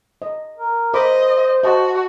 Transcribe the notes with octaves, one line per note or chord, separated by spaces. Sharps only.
D#5
A#4
A#4 C5 D#5 B5 D6
F#4 D#5 A5